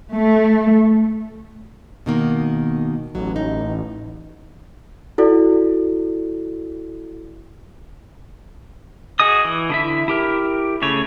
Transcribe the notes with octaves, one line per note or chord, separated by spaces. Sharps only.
A3
B2 D#3 A#3
A1 F#3
D#4
E4 F#4 A4 D5
F#4 G#4 D#5 D#6
E3
D3 E4 E5
E4 G4 A#4
C#3 A3 C#5